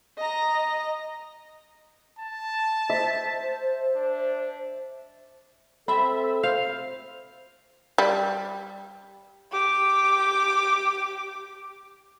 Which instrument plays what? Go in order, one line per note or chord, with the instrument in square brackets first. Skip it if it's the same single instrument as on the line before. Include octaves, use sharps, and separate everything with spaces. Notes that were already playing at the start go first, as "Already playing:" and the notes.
[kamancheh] D#5 A#5
[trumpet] A5
[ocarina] C5 [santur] E5
[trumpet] D4
[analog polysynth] C4 E5 [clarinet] A4 [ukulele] B5
[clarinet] C5 [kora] F5
[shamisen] G3
[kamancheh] G4 D6